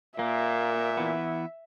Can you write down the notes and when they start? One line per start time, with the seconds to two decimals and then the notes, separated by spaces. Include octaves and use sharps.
0.19 A#2 A#3 E5
0.97 E3 B3